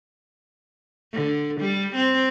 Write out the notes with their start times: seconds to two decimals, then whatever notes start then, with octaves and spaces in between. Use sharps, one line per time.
1.13 D3
1.61 G3
1.95 C4